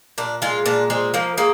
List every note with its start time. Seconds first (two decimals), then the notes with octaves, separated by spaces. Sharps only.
0.18 A#2 D4
0.42 G#3 F4
0.66 A#2 D4
0.90 G#3 C4
1.14 F3 A#3
1.38 G#3 A#3